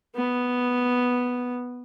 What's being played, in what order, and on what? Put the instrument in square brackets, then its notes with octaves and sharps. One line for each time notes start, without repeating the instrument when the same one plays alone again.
[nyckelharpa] B3